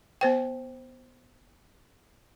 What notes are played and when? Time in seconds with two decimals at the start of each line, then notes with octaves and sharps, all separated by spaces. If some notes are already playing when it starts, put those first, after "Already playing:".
0.21 B3 C5 G5